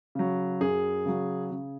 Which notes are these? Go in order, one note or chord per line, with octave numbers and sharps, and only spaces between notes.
C#3 F#3
F#2 G#4
C#3 F#3
C#3